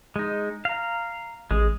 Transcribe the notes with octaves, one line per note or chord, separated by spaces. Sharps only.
G#3 D#4
F5 A#5
A1 G#3 G#4